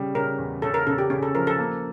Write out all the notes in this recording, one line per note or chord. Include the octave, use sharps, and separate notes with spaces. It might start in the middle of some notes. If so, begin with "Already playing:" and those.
Already playing: C#3 G3
C#3 A#4
E2
C#3 A4
A#4
C#3 A4
G4
C#3 C#4
A4
F3 A#4
A4
A#3